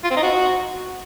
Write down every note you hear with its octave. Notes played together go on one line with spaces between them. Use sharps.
F4
C4
D#4
F#4